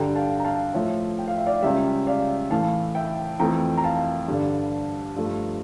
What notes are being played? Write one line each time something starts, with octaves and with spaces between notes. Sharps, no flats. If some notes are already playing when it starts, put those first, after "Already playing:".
Already playing: G2 D3 G3 G5 A#5
F5 A5
A#5
F5 A5
A2 F3 A3 C#5 E5
G5
F5
E5
D5 F5
C#2 C#3 G3 E5 G5
D5 F5
A2 E3 A3 F5 A5
E5 G5
F2 E3 A3 G5 A#5
A#5
F5 A5
G2 D3 G3
G2 F3 A3